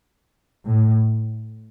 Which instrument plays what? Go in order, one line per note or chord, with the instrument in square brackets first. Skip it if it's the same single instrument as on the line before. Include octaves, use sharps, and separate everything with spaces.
[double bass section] A2